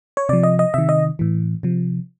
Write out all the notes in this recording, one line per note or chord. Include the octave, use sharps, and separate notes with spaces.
C#5
C3 F3 D5
D#5
D#5
C3 D#3 E5
D#5
A2 E3
C3 F3